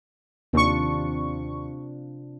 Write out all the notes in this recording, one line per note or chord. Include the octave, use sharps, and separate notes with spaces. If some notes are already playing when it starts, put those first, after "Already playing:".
D#2 C3 D4 F4 C#6